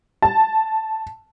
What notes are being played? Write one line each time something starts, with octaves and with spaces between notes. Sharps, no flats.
A5